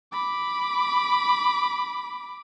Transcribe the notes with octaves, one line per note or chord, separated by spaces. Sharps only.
B5 D6